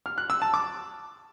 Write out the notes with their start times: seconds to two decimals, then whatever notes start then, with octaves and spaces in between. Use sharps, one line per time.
0.06 F6
0.18 F#6
0.30 E6
0.42 A5
0.54 D6